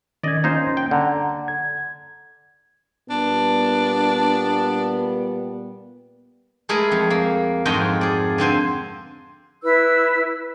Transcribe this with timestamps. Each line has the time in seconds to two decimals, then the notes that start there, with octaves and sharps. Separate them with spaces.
0.23 D#3 C#4 D5 D#5 G#6
0.44 A#3 C#4 D#4 F4 C5
0.77 G5
0.91 D3 F#5 A#5
1.48 G#6
3.10 A#2 G3 B3 D4
6.69 G#3 A3 E4 G#4 A#4
6.91 F2
7.10 A#3
7.65 F2 G#2 F4 F#4 D#5 G5
8.01 G#4 D5
8.38 D3 C4 C5 G#5
9.63 E4 B4 E6